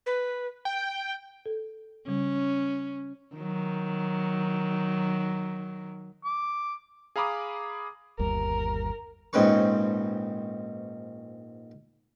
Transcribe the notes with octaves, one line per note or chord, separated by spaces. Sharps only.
B4
G5
A4
C#3 G3 C#4
D#3 F#3
D6
G#4 F5 A#5 B5 D6 D#6
G1 D#2 G3 A#4
A#1 G#2 C4 C#4 B4 C#6